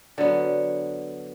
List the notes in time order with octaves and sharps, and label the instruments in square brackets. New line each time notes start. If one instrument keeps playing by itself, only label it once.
[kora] D3 F#3 B3 [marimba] D5